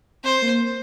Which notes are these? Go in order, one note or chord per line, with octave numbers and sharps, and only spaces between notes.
C4 C5
A#3